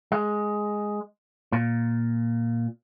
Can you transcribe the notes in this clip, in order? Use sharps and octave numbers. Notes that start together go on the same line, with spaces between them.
G#3
A#2